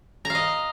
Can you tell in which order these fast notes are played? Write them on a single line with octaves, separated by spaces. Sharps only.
A#5 F5 D#5